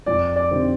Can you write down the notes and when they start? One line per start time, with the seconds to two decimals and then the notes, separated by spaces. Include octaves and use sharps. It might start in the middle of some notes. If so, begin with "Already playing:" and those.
0.06 F2 D5
0.36 D5
0.50 D3 G3 C4 D#4